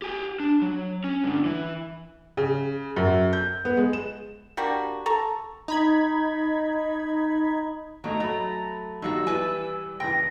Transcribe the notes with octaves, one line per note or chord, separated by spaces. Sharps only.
G4 G#5
D4
F#3
C#4
G2 D3
E3
C#3
F#2
G6
B3
G#3
E7
G3 A#3 D4 F#4
A4 A#5 C#6
D#4 B5 G#6
D#3 F#3 A3 D#4 A#5
F#3 A3 B5
G2 D#3 F#3 G3 D#4 F#4 E6
E3 G3 E4 B4 D5 G#5
F#1 E3 G5 A#6